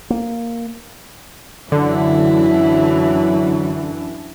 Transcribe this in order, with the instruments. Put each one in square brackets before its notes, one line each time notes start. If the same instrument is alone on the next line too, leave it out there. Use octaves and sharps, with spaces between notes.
[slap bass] A#3
[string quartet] F#2 E3 D4 [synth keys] D3 [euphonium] F#3 [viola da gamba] E4